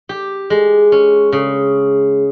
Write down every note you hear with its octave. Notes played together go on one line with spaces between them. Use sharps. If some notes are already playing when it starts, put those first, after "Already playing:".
G4
G#3
C#4
C#3